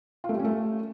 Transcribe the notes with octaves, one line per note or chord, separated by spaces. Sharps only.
F4
A3
G3
C#4
A3